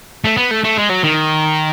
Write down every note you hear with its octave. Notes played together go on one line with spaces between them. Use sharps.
A3
B3
A3
A3
G#3
F#3
D#3